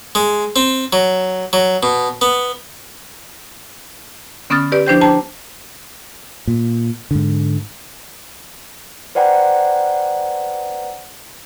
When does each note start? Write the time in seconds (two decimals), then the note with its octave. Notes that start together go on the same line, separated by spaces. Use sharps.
0.15 G#3
0.56 C4
0.93 F#3
1.53 F#3
1.83 B2
2.21 B3
4.50 D3 B3 C#4 D#6 F6 A6
4.72 G4 B4 D5
4.86 F3 D4 E4 C5 G5 G6
5.01 D4 C5 G5 A5 A#5
6.47 A#2
7.11 G#2 D3
9.15 B4 C5 D5 F#5 G5 A#5